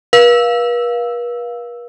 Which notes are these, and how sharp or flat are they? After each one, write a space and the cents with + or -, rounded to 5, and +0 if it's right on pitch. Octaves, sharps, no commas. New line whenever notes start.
B4 -45 F5 +0 E6 +0